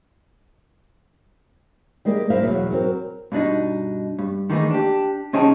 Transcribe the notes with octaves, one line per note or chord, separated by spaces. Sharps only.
G3 G#3 A#3 G4 C#5 D5
G3 A#3 E4 C5 E5 F5
E2 B2 F#3
F#3 C4 A#4
G2 B2 D4 D#4
G2
D#3 E3 A3 A#3 D#4 G#4
D4 G4
C2 C#4 D#4 G#4 G5 A5